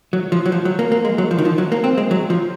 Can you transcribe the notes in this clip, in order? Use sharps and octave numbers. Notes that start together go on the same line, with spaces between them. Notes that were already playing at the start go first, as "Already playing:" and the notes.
F#3
F3
F#3
F3
F#3
A#3
A#3
G#3
F#3
F3
D#3
F3
F#3
A#3
C4
G#3
F#3
F3